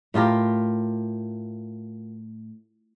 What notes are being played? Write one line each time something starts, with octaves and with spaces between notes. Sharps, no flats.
A2 F4 G4 A#4